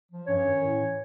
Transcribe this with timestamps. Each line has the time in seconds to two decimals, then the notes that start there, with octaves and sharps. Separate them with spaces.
0.09 F3
0.27 G2 C#4 C#5
0.44 D#3
0.62 A2
0.80 E3